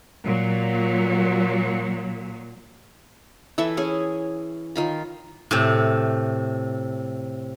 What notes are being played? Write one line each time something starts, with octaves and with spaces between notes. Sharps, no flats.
A#2 F#3
E3 E4 A4 E5
C#4 G#4
D#3 F4 B5
A2 C3